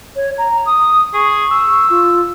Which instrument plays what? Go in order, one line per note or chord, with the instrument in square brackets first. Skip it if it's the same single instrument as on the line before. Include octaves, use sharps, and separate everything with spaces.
[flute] C#5
A#5
D#6
[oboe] G#4 [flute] C#6
[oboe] E6
[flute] F4